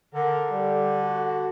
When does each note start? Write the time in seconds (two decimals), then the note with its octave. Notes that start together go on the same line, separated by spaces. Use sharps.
0.14 D3 A#4
0.51 G3 A4
1.01 F#4